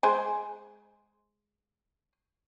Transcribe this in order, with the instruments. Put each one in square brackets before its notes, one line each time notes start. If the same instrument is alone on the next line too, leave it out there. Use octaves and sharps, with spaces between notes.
[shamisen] G#3 C5 G#5